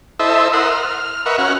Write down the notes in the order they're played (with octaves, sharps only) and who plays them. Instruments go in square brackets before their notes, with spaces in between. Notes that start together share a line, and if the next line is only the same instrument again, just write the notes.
[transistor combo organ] E4 A4 C5 D#5 E5
A#4 F#5 C6 D#6 E6
F6
A#4 B4 D#5 E5 F#5 C#6
C#4 F#4 F#5 F6